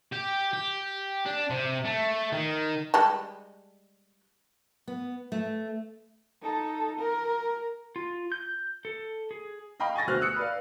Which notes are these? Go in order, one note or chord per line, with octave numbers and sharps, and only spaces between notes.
G4
G4
D4
C3
A3
D#3
G3 G#3 A5
B3
A3
D#4 A4
A#4
F4
G6
A4
G#4
D#5 F5 G5 B5
G#5 C#6 A6 A#6
D2 B2 C5 F6 F#6
D#6 E6 F#6 C#7
B4 D5 F5